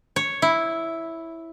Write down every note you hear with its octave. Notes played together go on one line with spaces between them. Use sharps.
C#5
E4